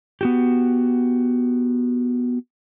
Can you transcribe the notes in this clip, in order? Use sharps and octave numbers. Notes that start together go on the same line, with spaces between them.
B3 F#4 G4